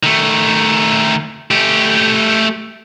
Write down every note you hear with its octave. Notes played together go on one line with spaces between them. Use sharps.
D#3 A3
A3 G4